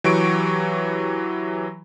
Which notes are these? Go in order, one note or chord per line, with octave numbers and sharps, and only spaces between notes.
E3 F#3 G4 C#6 D7